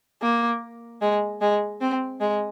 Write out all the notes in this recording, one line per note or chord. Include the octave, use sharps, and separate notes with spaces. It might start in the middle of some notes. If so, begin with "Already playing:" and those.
A#3
G#3
G#3
C4
G#3